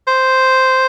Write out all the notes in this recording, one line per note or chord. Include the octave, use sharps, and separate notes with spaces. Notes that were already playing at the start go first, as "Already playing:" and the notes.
C5